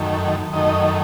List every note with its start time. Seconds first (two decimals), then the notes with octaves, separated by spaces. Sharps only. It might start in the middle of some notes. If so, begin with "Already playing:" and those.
Already playing: F#2 D#3 A3
0.53 F#2 D#3 A3 D#5